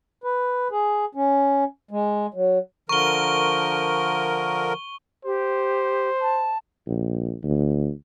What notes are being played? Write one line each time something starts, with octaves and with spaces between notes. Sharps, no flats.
B4
G#4
C#4
G#3
F#3
D3 F3 A#4 C#6 G7
G4 C5
A5
A#1
D2